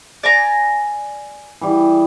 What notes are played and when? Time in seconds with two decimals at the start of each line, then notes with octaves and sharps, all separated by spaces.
0.23 D5 G#5 A#5
1.61 E3 G3 G#4